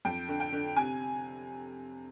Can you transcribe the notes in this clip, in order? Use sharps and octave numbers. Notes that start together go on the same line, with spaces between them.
F2 G5
D3
G5
D3
C3 G#5